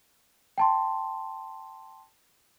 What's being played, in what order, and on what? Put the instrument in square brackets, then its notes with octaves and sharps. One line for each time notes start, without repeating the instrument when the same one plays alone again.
[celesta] G5 A5 C6